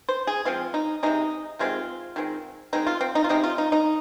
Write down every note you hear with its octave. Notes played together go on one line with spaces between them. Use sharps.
C5
G#4
F3 G#3 C4 F4
D#4
C3 D#3 G#3 D#4
C3 D#3 G#3 C4 F4
D#3 G#3 C4
D#3 G#3 C4 D#4
F4
C4
D#4
F4
C3 G#3 C4 D#4
F4
D#4
D#4